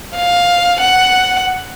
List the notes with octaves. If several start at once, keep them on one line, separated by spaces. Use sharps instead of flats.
F5
F#5